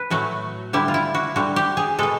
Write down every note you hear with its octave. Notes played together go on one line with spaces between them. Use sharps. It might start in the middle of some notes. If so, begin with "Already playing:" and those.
Already playing: B4
A2 F#3 A3 F#4
D3 G3 E4
F4
E4
F#4
D3 G3 F#4
G4
G#4
B2 G#3 A4